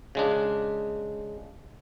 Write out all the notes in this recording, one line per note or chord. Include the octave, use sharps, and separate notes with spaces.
C#3 G#3 D4